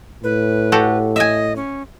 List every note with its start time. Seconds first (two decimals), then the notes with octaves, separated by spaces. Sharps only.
0.24 A2 B4
0.72 F#4 G4 A4
1.16 D#5 E5 G#5
1.56 C#4